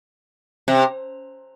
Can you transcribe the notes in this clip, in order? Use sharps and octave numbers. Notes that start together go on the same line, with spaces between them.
C3